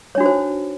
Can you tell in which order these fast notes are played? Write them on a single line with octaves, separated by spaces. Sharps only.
C#5 D4 F#4 D#4 C5